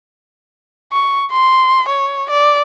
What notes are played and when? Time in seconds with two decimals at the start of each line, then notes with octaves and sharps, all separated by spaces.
0.93 C#6
1.32 C6
1.88 C#5
2.30 D5